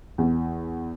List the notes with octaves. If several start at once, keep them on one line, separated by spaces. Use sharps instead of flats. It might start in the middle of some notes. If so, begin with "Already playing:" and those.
E2